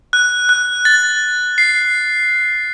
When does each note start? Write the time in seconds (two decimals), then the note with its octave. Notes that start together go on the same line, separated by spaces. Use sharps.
0.13 F#6
0.49 F#6
0.85 A6
1.58 C7